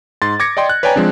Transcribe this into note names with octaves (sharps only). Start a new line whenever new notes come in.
G#2 C6 A6
D6 G#6 A#6 C#7
D5 D#5 G5 C6
F#6
B4 C#5 D5 G5 G#5 A#5
F3 G#3 C4 D4